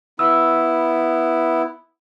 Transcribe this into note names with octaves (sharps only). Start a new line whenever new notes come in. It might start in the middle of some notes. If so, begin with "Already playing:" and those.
B3 E4 E6